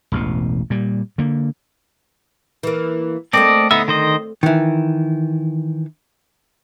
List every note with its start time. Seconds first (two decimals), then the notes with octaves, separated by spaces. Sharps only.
0.12 E1 A1 B2
0.70 A#2 G3
1.18 D3 A#3
2.63 E3 A#3
3.33 A3 A#3 C4 A4 D5 D#5
3.71 D3 B3 D#4 E5
3.88 D#3 C5 D#5
4.43 D#3 E3